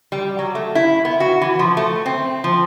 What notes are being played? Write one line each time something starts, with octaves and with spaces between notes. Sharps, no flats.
G3
F#3
A3
E4
B3
F#4
E3
F3
A3
C4
F3